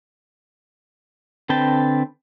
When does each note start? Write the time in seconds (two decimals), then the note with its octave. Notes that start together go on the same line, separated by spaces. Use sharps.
1.49 D3 C4 B4 G5 A5